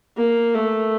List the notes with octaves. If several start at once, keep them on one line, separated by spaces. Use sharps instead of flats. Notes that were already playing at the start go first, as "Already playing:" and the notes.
A#3
A3